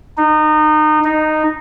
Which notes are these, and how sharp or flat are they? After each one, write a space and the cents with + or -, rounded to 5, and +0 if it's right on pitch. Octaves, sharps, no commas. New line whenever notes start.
D#4 -25
D#4 -10